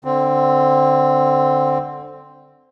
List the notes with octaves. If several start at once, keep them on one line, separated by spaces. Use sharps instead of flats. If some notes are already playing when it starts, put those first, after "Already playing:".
D3 C4